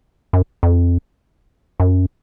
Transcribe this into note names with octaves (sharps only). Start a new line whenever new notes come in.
F#2
F2
F#2